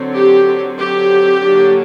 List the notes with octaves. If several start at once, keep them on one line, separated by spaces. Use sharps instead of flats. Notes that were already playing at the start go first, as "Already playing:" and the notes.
Already playing: D3 F#3 C4
G4
G4
D3 F#3 A#3 D4